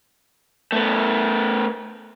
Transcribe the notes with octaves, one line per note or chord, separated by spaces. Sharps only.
A3 B3